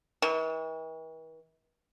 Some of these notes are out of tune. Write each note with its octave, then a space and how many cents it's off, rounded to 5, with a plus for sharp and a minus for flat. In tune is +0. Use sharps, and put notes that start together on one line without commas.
E3 -45